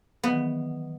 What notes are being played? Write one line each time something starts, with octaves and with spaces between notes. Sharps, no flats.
D#3 E3 F#3 B3